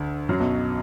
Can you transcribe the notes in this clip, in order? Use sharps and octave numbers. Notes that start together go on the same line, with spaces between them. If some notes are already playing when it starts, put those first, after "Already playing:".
Already playing: D2 D3
F#2 F#3
B1 B2